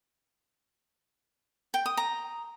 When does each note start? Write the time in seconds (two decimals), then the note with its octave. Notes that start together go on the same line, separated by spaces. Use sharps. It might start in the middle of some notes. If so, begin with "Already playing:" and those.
1.74 G5
1.86 D#6
1.97 A#5